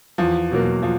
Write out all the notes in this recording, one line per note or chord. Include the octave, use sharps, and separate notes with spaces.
E2 F3
B2 F#3 A#3
F3